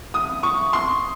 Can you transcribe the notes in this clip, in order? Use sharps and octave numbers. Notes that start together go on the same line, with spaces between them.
D#6
C#6
C6